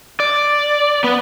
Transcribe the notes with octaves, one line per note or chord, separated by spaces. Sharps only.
D5
B3